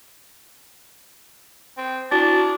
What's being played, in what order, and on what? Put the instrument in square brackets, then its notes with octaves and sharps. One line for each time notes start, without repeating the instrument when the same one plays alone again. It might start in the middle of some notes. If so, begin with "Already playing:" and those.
[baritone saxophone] C4
[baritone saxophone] D4 [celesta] E4 F#4 A6